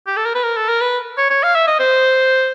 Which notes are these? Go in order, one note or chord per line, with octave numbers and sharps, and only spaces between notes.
G4
A4
A#4
B4
A#4
A4
A#4
B4
C#5
C#5
F5
E5
D#5
C5